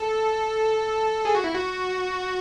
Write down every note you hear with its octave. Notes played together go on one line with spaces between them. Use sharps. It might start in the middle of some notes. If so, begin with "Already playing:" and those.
Already playing: A4
G#4
F#4
E4
F#4